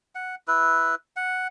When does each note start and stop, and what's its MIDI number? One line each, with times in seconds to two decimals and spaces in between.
0.15 0.35 78
0.48 0.95 64
0.48 0.95 71
1.16 1.47 78